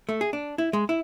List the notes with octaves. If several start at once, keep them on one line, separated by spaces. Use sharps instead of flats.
A3
G#4
D4
E4
G#3
E4